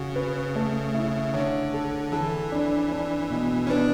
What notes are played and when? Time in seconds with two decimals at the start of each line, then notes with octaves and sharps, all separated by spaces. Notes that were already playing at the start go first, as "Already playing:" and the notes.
Already playing: C#3 F#4
0.16 B4
0.56 A3
0.94 E4
1.34 D3 C#5
1.74 A4
2.12 E3 A4
2.52 D4
2.92 D4
3.30 B2
3.67 C#4
3.70 B3 D4